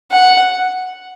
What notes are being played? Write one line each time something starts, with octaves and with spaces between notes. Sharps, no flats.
F#5